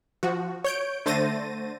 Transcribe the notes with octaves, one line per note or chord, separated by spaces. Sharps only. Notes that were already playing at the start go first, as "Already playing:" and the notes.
F3 F#4
C#5 G6 D7
D3 A3 C5 A6 A#6 D#7